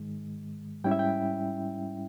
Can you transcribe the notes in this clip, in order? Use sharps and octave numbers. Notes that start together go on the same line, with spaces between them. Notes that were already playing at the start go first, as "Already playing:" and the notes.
Already playing: G#2 D#3 G#3
G#2 G3 C#4 E4 G5
E5
G5